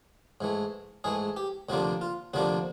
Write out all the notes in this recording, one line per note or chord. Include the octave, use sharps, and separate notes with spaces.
G#2 E3 A3
G#2 E3 A3 G#4
G4
D2 C3 F3 A#3 D4 F#4
F4
D2 C3 F3 A#3 D4 F#4